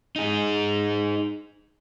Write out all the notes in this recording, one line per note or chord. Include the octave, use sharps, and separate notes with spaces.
D#4 G#4